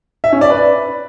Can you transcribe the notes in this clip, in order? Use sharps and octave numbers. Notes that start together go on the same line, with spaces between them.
E5
C#4
D5
B4